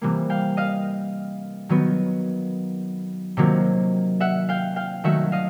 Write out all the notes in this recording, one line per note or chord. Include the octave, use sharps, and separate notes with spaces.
C3 E3 G3 A#3
F5 G5
D#5 F5
D#3 F#3 B3
C3 D#3 F#3 A#3
E5 F#5
F5 G5
F5 G5
D#3 F#3 A3 E5 F#5
D#5 F5